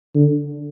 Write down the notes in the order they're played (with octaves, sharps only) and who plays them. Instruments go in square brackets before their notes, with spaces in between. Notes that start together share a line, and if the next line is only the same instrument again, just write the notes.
[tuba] D3